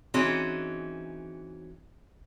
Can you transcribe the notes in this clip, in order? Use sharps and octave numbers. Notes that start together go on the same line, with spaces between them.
E3 C4 C#4 D#4 F#4 G#4